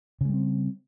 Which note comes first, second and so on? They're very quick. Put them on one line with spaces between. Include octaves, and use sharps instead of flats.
C#3 G#3 G3 C4